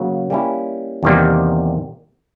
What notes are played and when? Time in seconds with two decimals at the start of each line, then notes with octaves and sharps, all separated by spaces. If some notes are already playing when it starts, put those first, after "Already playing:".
Already playing: C#3 F#3 A#3
0.30 G3 A#3 C#4 E4
1.03 E2 C3 D#3 G3 A#3